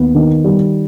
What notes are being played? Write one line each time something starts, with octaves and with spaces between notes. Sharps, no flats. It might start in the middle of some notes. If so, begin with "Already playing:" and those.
Already playing: D#2 B3
D#3
G3